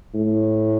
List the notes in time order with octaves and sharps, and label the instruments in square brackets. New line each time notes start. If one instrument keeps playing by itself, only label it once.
[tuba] A2